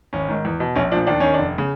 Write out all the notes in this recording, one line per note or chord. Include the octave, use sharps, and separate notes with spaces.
G#1 C#4
G#2 D#3
E2
B2
A#1 C#4
A#2 F3 D4
D#2 D4
D#3 C#4
F1 D4
C#3